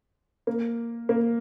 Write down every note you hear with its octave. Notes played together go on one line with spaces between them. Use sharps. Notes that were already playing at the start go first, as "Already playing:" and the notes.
A#3
A#3